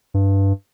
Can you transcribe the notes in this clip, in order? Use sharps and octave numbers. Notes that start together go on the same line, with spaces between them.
G2